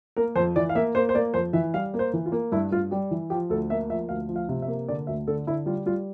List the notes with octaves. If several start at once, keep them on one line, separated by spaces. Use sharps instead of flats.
A#3 A#4
F2 C5
E3 D5
F5
A#3 E5
A#3 C5
C5
A#3 D5
F2 C5
E3 E5
G3 F5
A#3
C5
E3
F4
A#3
G2 E4
G2 F4
G3 G4
E3
F3 G4
D2 A4
A#3 E5
F3 E5
D2 F5
F3
F5
C3
E5
A#3
D3 D5
D2 E5
D3 A4
D3 E4
G3 F4
G3 F4